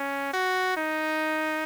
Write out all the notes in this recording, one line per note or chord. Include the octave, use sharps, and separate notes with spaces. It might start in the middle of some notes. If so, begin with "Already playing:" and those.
Already playing: C#4
F#4
D#4